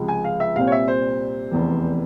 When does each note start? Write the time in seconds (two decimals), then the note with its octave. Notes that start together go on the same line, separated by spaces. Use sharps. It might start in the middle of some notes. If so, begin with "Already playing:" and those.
Already playing: C#2 C3 F3 G#3
0.08 G#5
0.24 F5
0.40 E5
0.56 C2 A#2 G3 C4 F5
0.67 C#5
0.72 E5
0.88 C5
1.51 F1 E2 E3